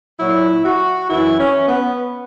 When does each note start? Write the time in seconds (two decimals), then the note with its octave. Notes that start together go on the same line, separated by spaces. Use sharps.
0.19 A#2 F#3 E4
0.64 F#4
1.09 F#2 E3 E4
1.39 C#4
1.68 B3